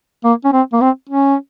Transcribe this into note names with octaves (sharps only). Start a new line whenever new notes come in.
A#3
C#4
C4
A#3
C4
C#4